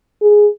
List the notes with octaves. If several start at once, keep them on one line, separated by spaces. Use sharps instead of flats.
G#4